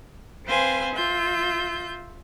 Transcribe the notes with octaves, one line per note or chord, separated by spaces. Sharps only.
C4 B4 C5 F5 G#5
F4 E5 G6